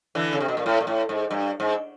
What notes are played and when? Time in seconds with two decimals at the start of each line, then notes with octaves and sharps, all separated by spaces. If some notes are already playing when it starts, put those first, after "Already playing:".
0.15 D3 E3
0.33 C#3
0.40 C3
0.48 B2
0.57 A#2
0.66 A2
0.81 A#2
0.87 A2
1.09 G#2
1.31 G2
1.60 G#2